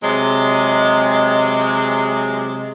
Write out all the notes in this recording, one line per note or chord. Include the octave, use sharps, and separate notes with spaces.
C3 F#3 G#3